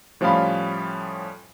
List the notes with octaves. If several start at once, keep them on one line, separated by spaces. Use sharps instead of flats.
A2 F3 G3 C#4 F5 B5